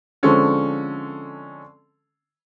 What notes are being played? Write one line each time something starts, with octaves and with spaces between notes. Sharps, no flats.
D3 F3 G#3 C4 C#4 A4